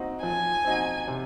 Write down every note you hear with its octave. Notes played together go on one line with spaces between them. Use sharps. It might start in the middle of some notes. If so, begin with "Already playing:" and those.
Already playing: C4 D#4 F#4
F3 G#5
C4 D#4 F#4
C3